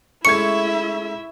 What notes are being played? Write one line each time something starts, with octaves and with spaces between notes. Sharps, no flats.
G#3 A3 C#4 E4 E5 C#6 G#6 C#7